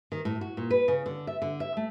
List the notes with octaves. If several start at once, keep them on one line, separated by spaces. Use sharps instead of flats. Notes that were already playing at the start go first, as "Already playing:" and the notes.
D#3
A2
F#4
A#2
B4
C#3
D3
E5
D3
E5
A3